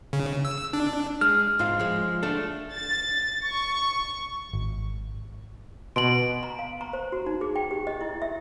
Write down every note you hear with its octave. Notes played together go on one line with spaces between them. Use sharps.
C#3
E6
D4
G#3 F6
G#2 F4 F5
F3 G#3
A3 D4 A4
A6
C#6
G#1
B2 C6 D7 F#7
A#5
F5
A#5
C5
F#4
D#4
G#4
G5
G4
D#5
E4
E5